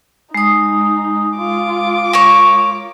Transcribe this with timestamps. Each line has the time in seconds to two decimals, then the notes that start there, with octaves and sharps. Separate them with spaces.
0.35 G#3 D#4 D#6
1.37 F4 D6
2.13 A#3 C#5